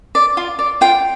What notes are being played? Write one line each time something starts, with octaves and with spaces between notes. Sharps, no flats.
D5
F4
D5
F4 G5